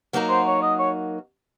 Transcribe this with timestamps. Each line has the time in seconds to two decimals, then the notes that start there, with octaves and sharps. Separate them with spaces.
0.13 F#3 A#3 D#4 F#4 A#4
0.29 C5
0.46 C#5
0.62 D#5
0.79 C#5